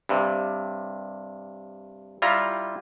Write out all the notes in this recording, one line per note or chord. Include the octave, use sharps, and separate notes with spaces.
G2 C3
G3 E4 F4 A#5